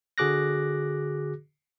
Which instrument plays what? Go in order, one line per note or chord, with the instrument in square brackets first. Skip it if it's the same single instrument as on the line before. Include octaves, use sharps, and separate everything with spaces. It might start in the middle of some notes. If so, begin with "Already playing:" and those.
[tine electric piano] D3 F#4 G#4 D6 F#6 A#6